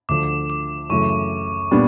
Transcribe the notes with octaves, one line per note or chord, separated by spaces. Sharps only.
D2 D3 F3 D6
D6
F#2 C#3 E3 A3 C#6
A#2 G3 B3 D4